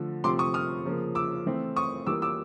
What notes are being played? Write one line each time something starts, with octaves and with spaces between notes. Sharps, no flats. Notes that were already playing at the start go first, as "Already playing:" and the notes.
Already playing: D3 F3 A3
C3 F3 A3 C4 C6 D6
C#6 D#6
D#6 F6
C#3 F3 A#3
D6 E6
E3 A3 C4
C#6 D#6
E3 G3 A#3 D6 E6
D6 E6